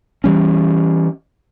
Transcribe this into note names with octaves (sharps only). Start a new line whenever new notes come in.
E3 G3 C#4